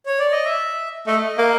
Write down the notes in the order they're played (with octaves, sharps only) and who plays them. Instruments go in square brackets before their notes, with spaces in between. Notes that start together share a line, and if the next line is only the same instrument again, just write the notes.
[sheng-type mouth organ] C#5
D5
D#5
E5
[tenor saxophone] A3 [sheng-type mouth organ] D#5
[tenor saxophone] A#3